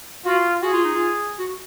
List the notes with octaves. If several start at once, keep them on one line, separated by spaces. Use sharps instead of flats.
F4 F#4
F#4 G#4
F4
D#4
F4
F#4